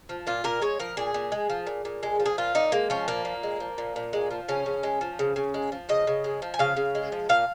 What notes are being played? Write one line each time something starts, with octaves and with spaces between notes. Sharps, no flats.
F3
A#2 F4
A#2 A#4
G#3 C#5
F3 A#4
A#2 G#4
A#2
G#3
F3
A#2
A#2
G#3
F3
G#4
A#2 F4
A#2 D#4
G#3 A#3
F3 C#4
A#2 A#3
A#2
G#3
F3
A#2
A#2
G#3
F3
C#3 C#4
C#3
G#3
F3
C#3
C#3
G#3
F3
C#3 D#5
C#3
G#3
F3
G#5
C#3 F5
C#3
G#3
F3
A#2 F5